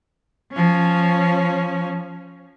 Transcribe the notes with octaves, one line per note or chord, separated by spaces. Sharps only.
F3 C#4